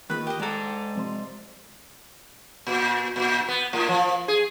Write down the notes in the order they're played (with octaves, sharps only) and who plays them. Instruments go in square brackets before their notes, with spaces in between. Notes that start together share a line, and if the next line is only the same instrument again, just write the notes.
[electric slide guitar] D#3 [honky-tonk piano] A#3 F4 G#4 [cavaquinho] B4 B5
[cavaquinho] G4 D#5 [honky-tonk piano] G5
[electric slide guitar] G#3 A#5 [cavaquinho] A4 D5
[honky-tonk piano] C3 F3 C6
[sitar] A#2
A#2
B3
A2
F3
G#4